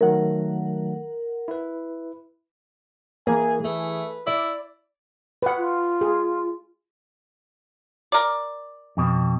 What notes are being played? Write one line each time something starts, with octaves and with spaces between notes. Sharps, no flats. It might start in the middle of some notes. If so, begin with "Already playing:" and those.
D#3 F#3 A3 A#4 F#5
E4 B4
E3 A#3 G#4 G#5
A3 B4 E5
E4 D5
B4 F#5
F4
G#4
A#4 D5
F2 B2